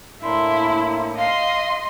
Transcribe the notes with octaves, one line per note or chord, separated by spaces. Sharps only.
A2 A#3 D4 E4 C6
D#5 F5 C6